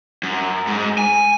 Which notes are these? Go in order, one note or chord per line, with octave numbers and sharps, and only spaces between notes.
F#2
G#2
G#5